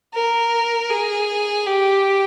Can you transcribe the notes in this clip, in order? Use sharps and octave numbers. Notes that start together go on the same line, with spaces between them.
A#4
G#4
G4